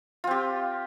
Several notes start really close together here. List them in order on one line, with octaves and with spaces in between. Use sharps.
F4 C4 G4